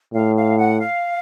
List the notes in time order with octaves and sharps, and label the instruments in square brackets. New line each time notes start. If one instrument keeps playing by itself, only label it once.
[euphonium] A2 [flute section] F5
[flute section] F5
F#5
F5